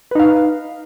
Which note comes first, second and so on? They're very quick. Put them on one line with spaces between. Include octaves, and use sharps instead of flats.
B4 D#4 F5